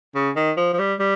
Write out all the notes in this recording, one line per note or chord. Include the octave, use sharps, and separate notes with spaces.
C#3
D#3
F3
F3
G3
G3